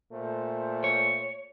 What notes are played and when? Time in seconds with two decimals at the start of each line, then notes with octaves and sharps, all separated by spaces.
0.13 A#2 A3 C5
0.84 C#5